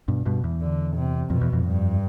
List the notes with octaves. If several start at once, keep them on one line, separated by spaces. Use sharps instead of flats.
G2 B2
G2 B2
E2
D3
C3
F2 B2
E2
F2
G2